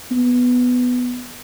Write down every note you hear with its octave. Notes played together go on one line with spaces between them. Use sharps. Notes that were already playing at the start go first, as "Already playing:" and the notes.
B3